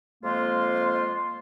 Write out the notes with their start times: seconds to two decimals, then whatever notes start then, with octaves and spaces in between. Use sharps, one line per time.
0.24 F2 G#3 A#3 F4 C5 C6